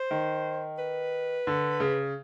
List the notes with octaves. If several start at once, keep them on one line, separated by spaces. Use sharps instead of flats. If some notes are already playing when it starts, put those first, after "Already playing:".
Already playing: C5
D#3
B4
D3
C#3